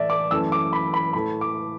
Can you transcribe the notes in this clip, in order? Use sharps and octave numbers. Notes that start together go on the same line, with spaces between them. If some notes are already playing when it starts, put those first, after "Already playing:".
Already playing: A2 E3 A3 D5 E5
D6
F#2 E3 A3 E6
D6
B5
B5
A2 E3 A3 B5
D6